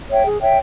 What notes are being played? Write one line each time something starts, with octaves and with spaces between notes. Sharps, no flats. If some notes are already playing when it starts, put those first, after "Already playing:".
C#5 E5 G5
G#4
C#5 E5 G5